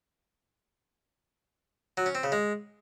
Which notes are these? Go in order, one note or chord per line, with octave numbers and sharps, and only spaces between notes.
F#3
C#4
C4
C#3
G#3